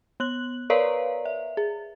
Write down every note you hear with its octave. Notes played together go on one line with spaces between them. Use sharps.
B3 F#6 F#7
A#4 B4 C#5 D5 F5 A#5
E5
G#4